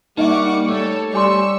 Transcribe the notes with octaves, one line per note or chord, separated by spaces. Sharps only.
G3 A#3 D#4 D#5 E5 F#5 C#6 D6
A3 A4 C#5
G3 D5 G#5 C6 C#6 E6